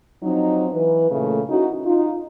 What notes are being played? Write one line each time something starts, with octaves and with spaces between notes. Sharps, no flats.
F3 F#3 C4 D#4
E3 B4
A#2 C#3 A3
C#4 D#4 E4 F#4
D#4 F4